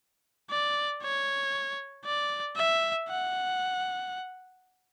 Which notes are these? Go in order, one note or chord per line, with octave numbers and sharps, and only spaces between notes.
D5
C#5
D5
E5
F#5